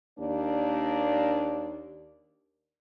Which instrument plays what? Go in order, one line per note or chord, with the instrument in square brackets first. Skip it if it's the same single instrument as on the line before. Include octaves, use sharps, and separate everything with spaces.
[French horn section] D#2 A#3 D4 D5